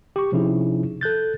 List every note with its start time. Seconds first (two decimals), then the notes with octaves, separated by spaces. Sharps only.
0.16 G4 C#6
0.32 C3 F3 C#4 D#4 E4 G#4
1.01 A4 F#6 G6 A6